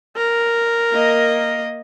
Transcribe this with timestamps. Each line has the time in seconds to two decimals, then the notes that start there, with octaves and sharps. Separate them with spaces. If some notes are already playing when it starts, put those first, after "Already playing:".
0.17 A#4
0.93 A#3 D#5